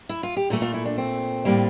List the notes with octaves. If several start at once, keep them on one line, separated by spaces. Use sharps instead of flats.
E4
F4
G4
A#2 A3 A4
F4
E4
D4
C4
A2 G3 A#3